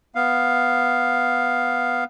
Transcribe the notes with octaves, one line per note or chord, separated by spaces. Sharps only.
B3 F5